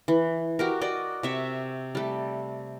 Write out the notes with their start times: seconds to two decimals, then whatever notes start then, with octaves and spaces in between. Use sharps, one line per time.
0.08 E3
0.59 F#4 G4 A#4
0.81 F#4 D5 D#5
1.23 C3 E5 C#6
1.95 G3 A3